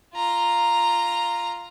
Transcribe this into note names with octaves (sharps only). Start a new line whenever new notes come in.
F4 A#5